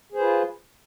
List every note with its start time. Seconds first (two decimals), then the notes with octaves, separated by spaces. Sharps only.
0.12 G#4
0.15 C5
0.19 B4
0.22 F4